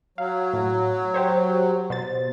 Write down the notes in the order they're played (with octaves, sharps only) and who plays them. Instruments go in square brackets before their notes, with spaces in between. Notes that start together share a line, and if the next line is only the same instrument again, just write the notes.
[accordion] F#3 [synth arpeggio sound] F5
[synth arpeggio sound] A2
G4 C5 C#5
B2 C5 A6